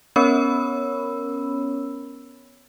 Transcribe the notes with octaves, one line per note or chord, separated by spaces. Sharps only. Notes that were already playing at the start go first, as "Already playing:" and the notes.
B3 C#4 A#4 C#5 B5 E6